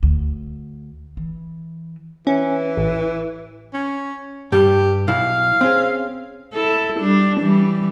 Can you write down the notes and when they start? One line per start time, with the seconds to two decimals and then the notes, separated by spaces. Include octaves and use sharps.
0.03 D2
1.17 E3
2.27 E3 C#4
2.77 A1
3.74 C#4
4.52 G2 G3 G4
5.08 B1 E4 F5
5.61 C4 C#4 G#4
6.54 E4 A4
7.00 G3 D4
7.40 E3 G3